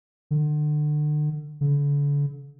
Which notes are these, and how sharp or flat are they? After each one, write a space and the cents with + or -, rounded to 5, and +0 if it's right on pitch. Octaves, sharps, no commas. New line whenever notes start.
D3 +35
D3 -40